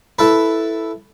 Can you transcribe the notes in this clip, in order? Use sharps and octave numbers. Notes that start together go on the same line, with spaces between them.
E4 A4 B4